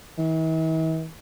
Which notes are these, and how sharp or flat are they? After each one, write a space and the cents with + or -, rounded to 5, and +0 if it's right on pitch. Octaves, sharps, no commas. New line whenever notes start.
E3 -45